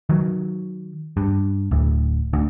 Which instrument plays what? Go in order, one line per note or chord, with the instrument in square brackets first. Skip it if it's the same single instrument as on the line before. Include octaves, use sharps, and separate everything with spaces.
[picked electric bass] D#3 F#3
G2
D1 D2
D2